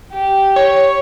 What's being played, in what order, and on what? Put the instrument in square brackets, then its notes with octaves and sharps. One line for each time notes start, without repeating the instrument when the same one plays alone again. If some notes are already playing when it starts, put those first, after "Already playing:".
[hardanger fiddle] G4
[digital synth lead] C#5